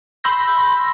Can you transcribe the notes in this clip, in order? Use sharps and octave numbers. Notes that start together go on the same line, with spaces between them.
B5 C6 E6 G6 A#6